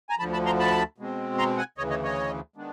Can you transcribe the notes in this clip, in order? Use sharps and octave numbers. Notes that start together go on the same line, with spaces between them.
G#5 A#5
D2 D3 F3 A5 B5
A5 B5
A#5 C6
A5 B5
B2 G#3 C4
A#5 C6
F#5 G#5
D2 C#3 E3 C#5 D#5
C#5 D#5
C#5 D#5
D#3 G#3 B3 D4